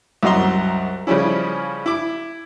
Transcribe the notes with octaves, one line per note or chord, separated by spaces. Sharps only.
C2 F#2 F#4 D#5 A#5 C6
C#3 F3 G3 C#4 E4
E4 D6